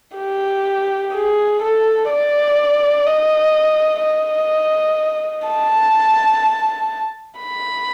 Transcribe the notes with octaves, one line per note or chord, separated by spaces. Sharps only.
G4
G#4
A4
D5
D#5
D#5
A5
B5